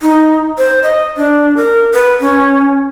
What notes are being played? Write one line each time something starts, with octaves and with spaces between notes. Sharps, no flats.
D#4
C5
D#5
D4
A#4
B4
C#4